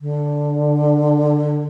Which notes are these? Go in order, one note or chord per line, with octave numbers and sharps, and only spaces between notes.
D3